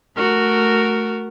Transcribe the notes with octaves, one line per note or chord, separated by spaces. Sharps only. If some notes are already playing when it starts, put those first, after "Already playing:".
A3 F#4 A#4